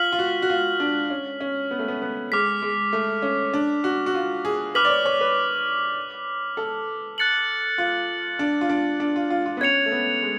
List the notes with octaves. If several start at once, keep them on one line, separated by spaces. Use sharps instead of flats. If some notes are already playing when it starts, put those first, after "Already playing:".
Already playing: F4 F6 B6 F#7
F4
F#4
F#4
F4
D4
C#4
C#4
B3
A3
B3
B3
G#3 D6 F6 B6
G#3
A3
C#4
D4
F#4
F#4
F4
G#4
B4 D6 F6 B6 F#7
D5
C#5
C#5
B4
A4
F#6 A6 C#7 F#7
F4
D4
F4
D4
D4
F4
F4
F4
B3
C#4 G#6 C#7 F7
A3
B3
G#3